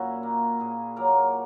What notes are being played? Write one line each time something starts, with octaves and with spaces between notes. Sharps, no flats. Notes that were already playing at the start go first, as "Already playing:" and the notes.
Already playing: A#2 F#3 C#4 E4 F#4
A#3
A#2 G#4
F#3 A#3 A#4